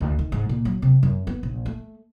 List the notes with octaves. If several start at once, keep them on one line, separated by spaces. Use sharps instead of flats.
D2
D#3
G#2
A#2
F#3
C3
F#2
B3
A#1
A3